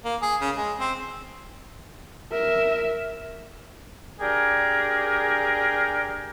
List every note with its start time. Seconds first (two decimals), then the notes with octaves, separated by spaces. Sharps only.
0.04 A#3
0.21 G#4
0.41 C#3
0.56 G#3
0.79 C4
2.32 A#4 E5
4.20 D4 G4 G#4 A#4